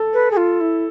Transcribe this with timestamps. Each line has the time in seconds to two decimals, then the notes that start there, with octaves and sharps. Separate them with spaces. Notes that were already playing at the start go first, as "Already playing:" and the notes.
Already playing: A4
0.13 B4
0.31 G#4
0.37 F4
0.60 E4